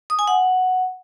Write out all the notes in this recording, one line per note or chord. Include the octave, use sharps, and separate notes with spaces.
D#6
G#5
F#5